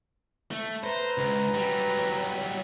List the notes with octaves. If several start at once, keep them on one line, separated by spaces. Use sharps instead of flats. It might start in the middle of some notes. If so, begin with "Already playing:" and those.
A3
B4 C5 A#5
C#2
F#3 G3